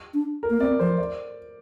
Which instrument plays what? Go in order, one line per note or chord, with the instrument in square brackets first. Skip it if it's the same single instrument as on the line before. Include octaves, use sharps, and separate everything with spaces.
[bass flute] D4
[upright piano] A#4
[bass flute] A#3
[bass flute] C4 [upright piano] D5
[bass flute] F3 [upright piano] C5
[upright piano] D5